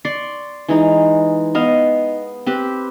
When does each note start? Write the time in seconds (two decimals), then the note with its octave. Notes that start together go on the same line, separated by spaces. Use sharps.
0.05 D5 C6 C#6
0.68 E3 G#3 D#4
1.55 B3 D#5 F5
2.46 C4 G4 B4